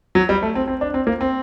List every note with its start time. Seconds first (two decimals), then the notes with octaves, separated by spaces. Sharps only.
0.15 F#3
0.29 G3
0.42 A3
0.55 C4
0.68 C4
0.81 D4
0.94 C4
1.07 A#3
1.21 C4